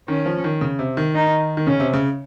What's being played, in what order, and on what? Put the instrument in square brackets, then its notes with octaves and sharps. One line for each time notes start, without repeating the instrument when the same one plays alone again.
[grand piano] D#3 [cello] C#4
[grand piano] F3
D#3
C#3
C3
D#3
[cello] D#4
[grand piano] D#3
[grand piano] C#3 [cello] C#4
[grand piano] C3
C#3